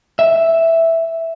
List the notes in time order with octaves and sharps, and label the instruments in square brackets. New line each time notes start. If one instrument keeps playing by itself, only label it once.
[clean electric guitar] E5